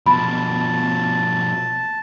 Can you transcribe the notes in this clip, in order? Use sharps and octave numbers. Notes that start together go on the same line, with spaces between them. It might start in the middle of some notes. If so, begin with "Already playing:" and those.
B2 F3 B3 A5 B5